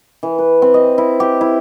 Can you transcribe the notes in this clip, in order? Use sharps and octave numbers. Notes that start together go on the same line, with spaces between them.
E3
B4
C4
D#5
E4
G4
E4